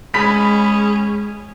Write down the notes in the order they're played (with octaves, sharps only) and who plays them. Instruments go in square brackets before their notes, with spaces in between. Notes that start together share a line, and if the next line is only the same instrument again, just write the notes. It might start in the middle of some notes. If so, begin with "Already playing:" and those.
[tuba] G#3 [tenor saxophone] C#4 [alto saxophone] G#4 [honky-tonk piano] B5 B6